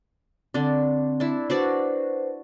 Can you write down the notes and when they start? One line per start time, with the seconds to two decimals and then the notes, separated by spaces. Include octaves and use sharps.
0.54 D3 C4 D4
1.20 D4 E4
1.50 D4 F#4 B4 C5 D5